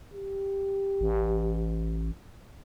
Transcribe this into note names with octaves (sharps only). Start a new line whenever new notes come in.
G4
A1